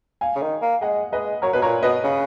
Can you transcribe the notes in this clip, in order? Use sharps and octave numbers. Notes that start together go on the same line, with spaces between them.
F5 G#5
C#3
D#3
A#3
G#3 D#5 F#5
G#3 B4 D#5
F#3 A#4 C#5
B2 B4
A#2 A#4 C#5
B2 B4 D#5
C#3